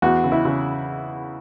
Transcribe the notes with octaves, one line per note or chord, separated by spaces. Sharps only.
E2 F#4
C#3
E4
C#3